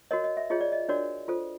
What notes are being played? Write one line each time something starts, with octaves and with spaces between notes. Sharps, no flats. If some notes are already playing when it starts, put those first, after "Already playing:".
F#4 A#4 C#5 D#5
D#5
E5
F4 G#4 C#5 D#5
D5
D#5
D4 F#4 A#4 C#5 D5
F4 A4 C5